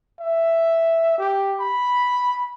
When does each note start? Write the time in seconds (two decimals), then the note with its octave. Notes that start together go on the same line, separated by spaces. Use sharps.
0.19 E5
1.18 G4
1.60 B5